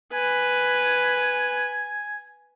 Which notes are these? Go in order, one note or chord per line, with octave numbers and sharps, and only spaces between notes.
B4 G#5